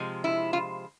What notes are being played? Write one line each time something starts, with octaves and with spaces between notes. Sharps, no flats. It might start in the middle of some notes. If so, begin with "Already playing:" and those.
Already playing: C3 F3 G#3
E4
F4